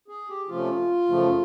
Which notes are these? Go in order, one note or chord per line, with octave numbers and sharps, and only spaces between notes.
G#4
G4
C3 F3 A3 C#4 F4
F#2 C#3 F3 A3